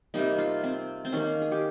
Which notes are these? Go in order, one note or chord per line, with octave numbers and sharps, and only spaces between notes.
C3 G3 A#3 D#4
F4
C4
C4
D#3 A#3 C#4
G#4
G4